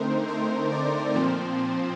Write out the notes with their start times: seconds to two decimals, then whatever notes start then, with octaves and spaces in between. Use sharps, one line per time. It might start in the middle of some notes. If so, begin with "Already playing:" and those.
Already playing: D3 A3 C4 D#4 A#4 C5
0.28 C5
0.72 D5
1.15 A#2 F3 C4 C5